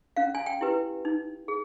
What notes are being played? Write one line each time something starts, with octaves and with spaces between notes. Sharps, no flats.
C#4 F5
G#5
G5
E4 G4 B4
D#4
G#4